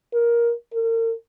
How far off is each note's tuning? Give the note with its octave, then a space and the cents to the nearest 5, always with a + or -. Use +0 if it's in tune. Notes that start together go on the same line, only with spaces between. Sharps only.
A#4 +15
A#4 -40